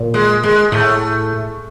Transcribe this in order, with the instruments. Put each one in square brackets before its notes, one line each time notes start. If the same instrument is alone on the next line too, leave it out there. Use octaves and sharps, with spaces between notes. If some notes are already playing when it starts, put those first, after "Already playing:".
Already playing: [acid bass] A#2
[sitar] G#3
G#3
[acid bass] A2 [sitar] A3